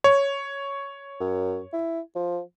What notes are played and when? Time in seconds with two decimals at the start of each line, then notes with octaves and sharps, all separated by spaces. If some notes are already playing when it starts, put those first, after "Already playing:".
0.04 C#5
1.20 F#2
1.73 E4
2.15 F3